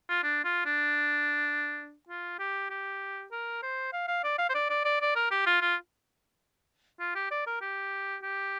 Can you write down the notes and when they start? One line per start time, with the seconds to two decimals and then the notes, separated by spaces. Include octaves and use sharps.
0.09 F4
0.24 D4
0.45 F4
0.65 D4
2.09 F4
2.39 G4
2.70 G4
3.32 A#4
3.63 C5
3.93 F5
4.08 F5
4.24 D5
4.38 F5
4.50 C5
4.54 D5
4.70 D5
4.85 D5
5.01 D5
5.16 A#4
5.31 G4
5.46 F4
5.62 F4
7.00 F4
7.15 G4
7.31 D5
7.47 A#4
7.61 G4
8.23 G4